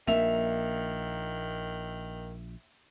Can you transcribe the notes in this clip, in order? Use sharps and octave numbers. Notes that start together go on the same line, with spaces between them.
A#1 D#3 A#3 E5 F7